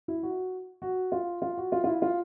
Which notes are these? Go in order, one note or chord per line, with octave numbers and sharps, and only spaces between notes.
E4
F#4
F#4
F4
F4
F#4
F4
F4
E4
F4